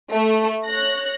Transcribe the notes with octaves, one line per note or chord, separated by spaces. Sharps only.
A3
C#5 F#6 A#6